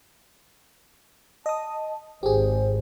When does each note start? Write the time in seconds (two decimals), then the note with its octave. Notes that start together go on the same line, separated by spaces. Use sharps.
1.46 D#5 A5 D#6
2.23 G#1 G4 G#4 C5